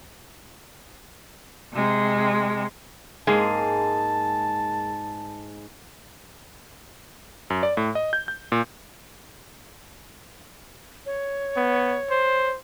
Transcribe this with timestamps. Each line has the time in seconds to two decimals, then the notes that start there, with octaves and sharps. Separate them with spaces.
1.73 C3 G#3
3.27 G#2 G#3 A#3 G#4 A5
7.50 F#2
7.63 D5
7.77 A2
7.95 D#5
8.13 G6
8.28 G6
8.52 A#2
11.06 C#5
11.56 B3
12.11 C5